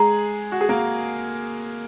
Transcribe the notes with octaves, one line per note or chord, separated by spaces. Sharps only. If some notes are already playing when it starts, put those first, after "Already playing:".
Already playing: G#3 G#4 A#5
F#4
G#4
A#3 A#4